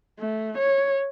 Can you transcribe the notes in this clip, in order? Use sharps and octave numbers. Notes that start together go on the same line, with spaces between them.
A3
C#5